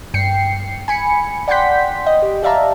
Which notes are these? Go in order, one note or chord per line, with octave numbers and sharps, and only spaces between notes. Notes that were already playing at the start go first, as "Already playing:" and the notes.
G2 G5 C7 C#7
G#5 B5 C#7
D5 F#5 G5 C6 G6 B6
D#5
G4
G4 D5 E5 F5 A5 A#5